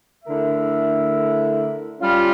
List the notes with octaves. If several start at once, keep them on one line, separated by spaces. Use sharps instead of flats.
D3 A3 E4 A#4 E5
G3 C#4 F4